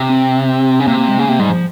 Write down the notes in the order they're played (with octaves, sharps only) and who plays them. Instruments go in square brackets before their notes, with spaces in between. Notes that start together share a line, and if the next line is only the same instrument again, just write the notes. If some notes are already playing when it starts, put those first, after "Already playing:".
Already playing: [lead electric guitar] C3
[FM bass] C4
[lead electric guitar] C#3
[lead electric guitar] C3 [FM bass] A#3
[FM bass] A#3
G#3
[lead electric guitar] C#3 [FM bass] A#3
[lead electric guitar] C3 [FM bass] A#3
[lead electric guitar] G#2 [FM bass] G3
[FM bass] F3